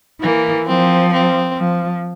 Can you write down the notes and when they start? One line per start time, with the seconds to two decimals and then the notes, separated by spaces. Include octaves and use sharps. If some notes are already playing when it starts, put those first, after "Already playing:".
0.22 E3 A#3
0.68 F3 C4
1.13 C4
1.58 F3